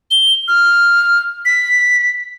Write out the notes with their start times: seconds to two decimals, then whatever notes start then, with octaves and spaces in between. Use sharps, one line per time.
0.11 G7
0.48 F6
1.45 B6